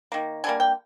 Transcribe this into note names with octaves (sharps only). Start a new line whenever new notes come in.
D#3 A#3
D3 G3 A#3 G#5
G5